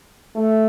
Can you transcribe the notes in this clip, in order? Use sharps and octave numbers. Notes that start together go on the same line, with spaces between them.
A3